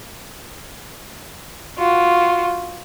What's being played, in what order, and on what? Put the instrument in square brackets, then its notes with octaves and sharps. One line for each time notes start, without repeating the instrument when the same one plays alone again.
[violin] F4 F#4